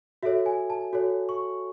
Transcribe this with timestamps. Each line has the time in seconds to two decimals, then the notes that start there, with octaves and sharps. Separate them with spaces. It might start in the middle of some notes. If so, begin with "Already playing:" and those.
0.23 F#4 A4 C#5 E5
0.46 G#5
0.70 A5
0.93 F#4 A4 C#5
1.29 C#6